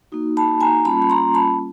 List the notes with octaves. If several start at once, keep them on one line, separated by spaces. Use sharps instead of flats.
A#3 D#4 F#4
A5 B5
G#5 A#5
G3 A#3 C#4 F4 A5 B5
B5
A#5 C6
A5 B5